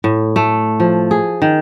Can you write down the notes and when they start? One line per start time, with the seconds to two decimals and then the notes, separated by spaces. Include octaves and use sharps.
0.04 A2
0.36 A3
0.80 F3
1.11 G#4
1.42 D#3